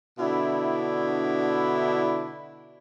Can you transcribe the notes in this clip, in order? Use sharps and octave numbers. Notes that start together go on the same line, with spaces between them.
B2 D3 D4 E4